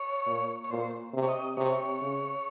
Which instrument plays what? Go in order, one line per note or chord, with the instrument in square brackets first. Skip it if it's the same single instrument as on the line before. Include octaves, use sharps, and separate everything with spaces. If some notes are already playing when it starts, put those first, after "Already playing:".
Already playing: [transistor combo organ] C#5
[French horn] A#2
[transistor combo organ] C#5
[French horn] A#2 [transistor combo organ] C5
[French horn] C3
[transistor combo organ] C#5
D#5
[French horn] C3 [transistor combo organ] C#5
[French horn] C#3